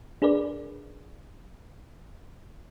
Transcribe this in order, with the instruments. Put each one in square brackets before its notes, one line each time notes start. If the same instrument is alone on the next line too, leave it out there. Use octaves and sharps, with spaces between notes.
[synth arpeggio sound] D4 G#4 A#4 B4 D5